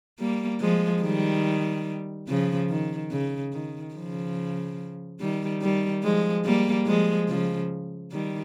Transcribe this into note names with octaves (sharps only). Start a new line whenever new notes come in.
G3 A#3
F3 G#3
D#3 G3
C#3 F3
D#3
C#3
D#3
C#3 F3
D#3 G3
D#3 G3
F3 G#3
G3 A#3
F3 G#3
C#3 F3
D#3 G3